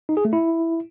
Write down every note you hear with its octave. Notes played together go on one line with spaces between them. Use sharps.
D#4
G#4
A3
E4